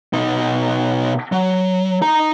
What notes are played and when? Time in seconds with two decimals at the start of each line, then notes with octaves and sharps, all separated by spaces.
0.13 B2 D#4
1.32 F#3
2.02 D#4 A#5